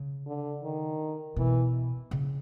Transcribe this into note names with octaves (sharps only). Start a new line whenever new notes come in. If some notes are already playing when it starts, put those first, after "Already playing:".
Already playing: C#3
D3
D#3
B2 E3
C#3